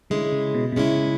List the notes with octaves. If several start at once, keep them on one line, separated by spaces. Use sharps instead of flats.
D3 G#3 C#4 E4
C#3
B2
B2
C#3 G#3 C#4 E4